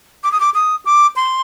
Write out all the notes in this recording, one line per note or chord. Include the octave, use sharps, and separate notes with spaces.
D6
D#6
D6
D#6
D6
C6